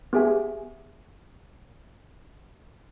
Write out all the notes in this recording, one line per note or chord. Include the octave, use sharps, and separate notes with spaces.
B3 G4 G#4 E5 G#5